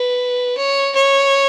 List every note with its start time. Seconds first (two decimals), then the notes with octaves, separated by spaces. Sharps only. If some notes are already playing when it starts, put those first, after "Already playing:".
Already playing: B4
0.57 C#5
0.95 C#5